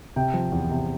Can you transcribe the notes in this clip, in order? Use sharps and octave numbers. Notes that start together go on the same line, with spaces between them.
C3 G5
F3
E2
C3